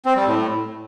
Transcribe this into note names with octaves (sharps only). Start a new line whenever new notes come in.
C4
G3
A2